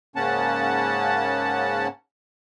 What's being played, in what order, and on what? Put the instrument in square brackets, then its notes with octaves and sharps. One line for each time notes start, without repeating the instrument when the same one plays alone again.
[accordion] G#2 C#3 A#3 C#4 F#5 A5